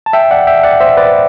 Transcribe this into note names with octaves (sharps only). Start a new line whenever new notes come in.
A5
E5 G5
D5 F#5
E5 G5
D5 F#5
C5 E5
B4 D5